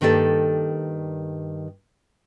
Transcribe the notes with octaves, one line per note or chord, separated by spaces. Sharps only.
G2 D#3 A#3 G4 A4 D5